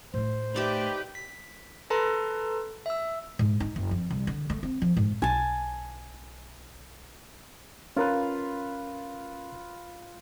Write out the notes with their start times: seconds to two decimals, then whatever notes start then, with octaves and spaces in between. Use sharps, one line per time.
0.14 A2 A3 C5
0.54 D#4 G4 B4 D5 E5
1.15 B6
1.90 A4 B4 A5 A#5 C6
2.86 E5 E6
3.39 G#2
3.60 D#4
3.76 F#1
3.91 F2
4.10 C2
4.27 D3
4.50 A3
4.63 C4
4.82 F3
4.97 G#2
5.22 B1 G#5 A5
7.97 C#4 F4 A#4 B4